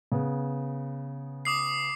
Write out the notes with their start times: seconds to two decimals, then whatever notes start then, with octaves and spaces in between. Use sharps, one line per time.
0.12 C#3 B3
1.45 D6 D#6 C7